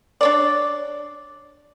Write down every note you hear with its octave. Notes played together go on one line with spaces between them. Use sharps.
D4 C#5 D5